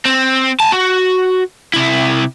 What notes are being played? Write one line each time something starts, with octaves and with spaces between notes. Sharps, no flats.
C4
G#5 A5
F#4
C3 E4